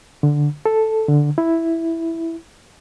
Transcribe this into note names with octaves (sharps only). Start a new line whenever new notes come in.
D3
A4
D3
E4